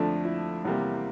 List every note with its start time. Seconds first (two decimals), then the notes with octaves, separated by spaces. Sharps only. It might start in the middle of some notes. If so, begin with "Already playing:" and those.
Already playing: F2 D3 F3 A3 D4
0.25 E4
0.65 E2 C3 G3 A#3